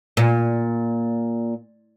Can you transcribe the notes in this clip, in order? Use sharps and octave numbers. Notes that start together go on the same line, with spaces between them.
A#2